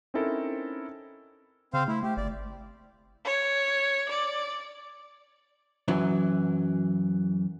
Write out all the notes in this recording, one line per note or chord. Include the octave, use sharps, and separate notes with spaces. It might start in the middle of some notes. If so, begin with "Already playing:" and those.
C4 C#4 D#4 E4 A4 A#4
C#3 C4 C5 F5
A3 E4
A3 G4
G1 D5
C#5
D5
F#2 E3 F#3